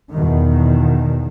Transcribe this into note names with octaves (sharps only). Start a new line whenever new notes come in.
E2 B2 D#3